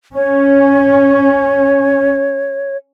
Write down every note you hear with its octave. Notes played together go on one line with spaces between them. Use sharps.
C#4 C#5